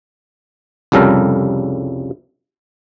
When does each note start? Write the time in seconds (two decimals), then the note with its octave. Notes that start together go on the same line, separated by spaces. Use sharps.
0.92 C2 F2 C#3 G3 A4 A#4